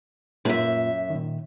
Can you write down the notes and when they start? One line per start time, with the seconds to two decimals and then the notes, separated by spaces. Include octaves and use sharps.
0.45 F#2 A#2 A#3 F4 E5
1.10 A#2 D#3